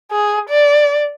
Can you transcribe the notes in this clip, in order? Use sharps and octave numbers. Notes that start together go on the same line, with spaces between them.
G#4
D5